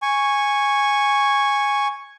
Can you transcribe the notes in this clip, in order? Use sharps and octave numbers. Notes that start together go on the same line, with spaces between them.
G#5 C#6